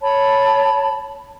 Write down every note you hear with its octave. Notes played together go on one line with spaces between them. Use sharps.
C#5 A5 B5